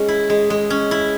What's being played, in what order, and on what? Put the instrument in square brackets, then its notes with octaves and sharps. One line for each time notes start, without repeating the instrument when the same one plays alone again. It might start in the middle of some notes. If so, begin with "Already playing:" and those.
Already playing: [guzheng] G#3 C#4
E4
G#3
G#3
C#4
E4